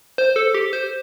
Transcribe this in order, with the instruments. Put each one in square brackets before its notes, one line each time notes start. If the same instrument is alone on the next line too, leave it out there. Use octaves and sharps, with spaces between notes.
[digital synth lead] C5
A4
G4
C5